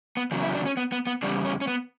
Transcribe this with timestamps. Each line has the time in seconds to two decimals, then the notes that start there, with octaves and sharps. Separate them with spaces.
0.17 B3
0.31 E2 C#3 F#3
0.43 E4
0.55 D4
0.65 C#4
0.77 B3
0.92 B3
1.07 B3
1.23 E2 C#3 G3 D4
1.45 C#4
1.61 C#4
1.67 B3